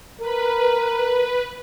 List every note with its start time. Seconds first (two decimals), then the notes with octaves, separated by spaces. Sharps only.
0.21 A#4 B4